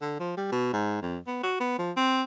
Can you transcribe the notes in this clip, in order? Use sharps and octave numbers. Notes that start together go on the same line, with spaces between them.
D3
F3
G3
B2
G#2
F2
B3
F#4
B3
F3
C4